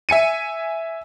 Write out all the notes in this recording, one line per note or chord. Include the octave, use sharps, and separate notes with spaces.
E5 G#5 C#7 D#7